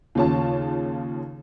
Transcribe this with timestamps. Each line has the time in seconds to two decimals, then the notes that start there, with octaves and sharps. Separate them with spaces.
0.15 D#2 C#3 F4 C#5 A5